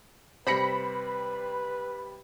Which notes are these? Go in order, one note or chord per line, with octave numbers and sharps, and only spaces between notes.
C3 G3 B4 C5 B5 A#6 C#7